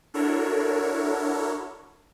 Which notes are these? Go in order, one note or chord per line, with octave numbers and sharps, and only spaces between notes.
D4 E4 F#4 A4 A#4 C#5